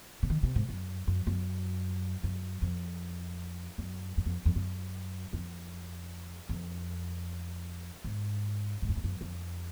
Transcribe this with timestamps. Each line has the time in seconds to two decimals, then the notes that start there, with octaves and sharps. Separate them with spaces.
0.23 C#3
0.30 D#3
0.43 C3
0.56 G#2
0.69 F#2
1.07 F#2
1.27 F#2
2.23 F#2
2.62 F2
3.78 F#2
4.17 F#2
4.26 F2
4.45 F2
4.56 F#2
5.33 F2
6.49 F2
8.04 G#2
8.82 G#2
8.89 F#2
8.97 F2
9.04 F#2
9.21 F2